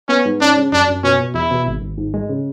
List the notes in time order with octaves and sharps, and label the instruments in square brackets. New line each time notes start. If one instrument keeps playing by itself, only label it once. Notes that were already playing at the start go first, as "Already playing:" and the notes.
[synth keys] B3 [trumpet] C#4
[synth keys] G#2
[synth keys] C#4 [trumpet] D4
[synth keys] C#3
[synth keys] F#2 [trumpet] D4
[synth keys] F#2
[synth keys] B2 [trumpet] C#4
[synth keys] B2
[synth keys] E2 [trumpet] E4
[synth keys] B2
G#1
G#1
G#2
G#3
C#3